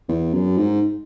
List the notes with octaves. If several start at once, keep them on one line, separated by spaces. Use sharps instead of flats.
E2
F#2
G#2